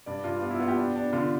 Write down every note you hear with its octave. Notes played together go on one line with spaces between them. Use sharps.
G2 D5
G2 F4
B3 F4
E4
B3 F4
G4
D4
D4
D3 F4